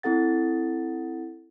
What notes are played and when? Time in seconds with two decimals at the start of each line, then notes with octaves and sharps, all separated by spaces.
0.03 C4 E4 A4 F#5 A6